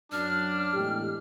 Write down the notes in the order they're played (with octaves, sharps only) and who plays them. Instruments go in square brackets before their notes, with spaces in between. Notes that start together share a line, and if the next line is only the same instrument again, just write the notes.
[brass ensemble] F#2 F#3 [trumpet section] D4 [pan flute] F6
[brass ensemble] E2 A2 G#3 [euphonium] G4